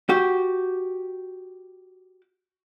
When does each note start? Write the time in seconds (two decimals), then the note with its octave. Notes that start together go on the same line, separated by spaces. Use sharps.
0.09 F#4 G4